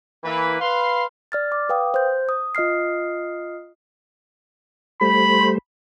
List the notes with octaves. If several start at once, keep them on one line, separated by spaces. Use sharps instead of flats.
E3 A#3 B4
B4 F5 C6
D5 F6 A6
D6
B4 F5 G5 D#6
C5 G6
D#6
F4 D#5 D#6 F6 C7
G3 A3 C5 B5